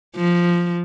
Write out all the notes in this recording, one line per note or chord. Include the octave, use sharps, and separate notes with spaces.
F3